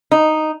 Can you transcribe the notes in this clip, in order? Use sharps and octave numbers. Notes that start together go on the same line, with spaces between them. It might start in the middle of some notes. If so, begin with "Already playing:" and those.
D#4